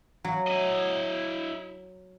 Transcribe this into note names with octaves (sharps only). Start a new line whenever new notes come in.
F#3
E4 D#5